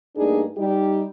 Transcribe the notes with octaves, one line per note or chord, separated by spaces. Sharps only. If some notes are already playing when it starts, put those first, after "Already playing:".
G2 A3 A#3 D4 D#4 G#4
G3 D#4 G4